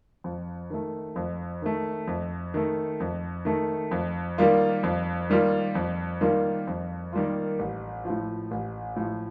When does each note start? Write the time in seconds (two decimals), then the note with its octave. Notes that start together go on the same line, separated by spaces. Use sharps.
0.24 F2
0.70 D#3 A3
1.16 F2
1.62 D#3 A3
2.07 F2
2.54 D#3 A3
3.00 F2
3.45 D#3 A3
3.91 F2
4.38 D#3 G3 A#3 F4
4.83 F2
5.30 D#3 G3 A#3 F4
5.75 F2
6.21 D#3 G3 A#3 F4
6.67 F2
7.13 D#3 G3 A#3 F4
7.59 A1
8.05 A2 F3
8.51 A1
8.96 A2 F3